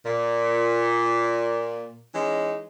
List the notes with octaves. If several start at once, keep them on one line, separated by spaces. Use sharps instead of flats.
A#2
E3 G#3 C#4 D#4